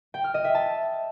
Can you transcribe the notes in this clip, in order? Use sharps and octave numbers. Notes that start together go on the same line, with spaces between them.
G5
F6
D#5
E5
A5